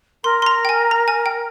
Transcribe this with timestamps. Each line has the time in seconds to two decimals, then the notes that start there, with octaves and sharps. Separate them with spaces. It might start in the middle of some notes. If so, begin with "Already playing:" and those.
0.24 A#4 C6
0.42 C6
0.46 A#5
0.65 G5
0.69 G#5
0.91 A#5
1.08 G#5
1.26 G5